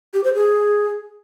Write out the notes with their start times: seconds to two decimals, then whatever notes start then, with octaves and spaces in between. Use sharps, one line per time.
0.14 G4
0.24 C5
0.34 G#4